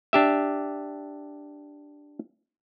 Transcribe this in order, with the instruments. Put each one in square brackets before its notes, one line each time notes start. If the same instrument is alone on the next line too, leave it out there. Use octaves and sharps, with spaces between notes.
[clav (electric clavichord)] D4 G4 E5